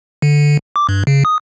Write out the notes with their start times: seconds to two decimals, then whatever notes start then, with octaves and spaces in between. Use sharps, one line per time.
0.22 D3
0.76 D6
0.89 G2
1.07 C#3
1.25 D#6